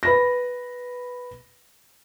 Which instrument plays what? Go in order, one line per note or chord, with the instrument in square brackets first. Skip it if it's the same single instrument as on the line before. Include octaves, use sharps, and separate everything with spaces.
[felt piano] B4 B5 A#6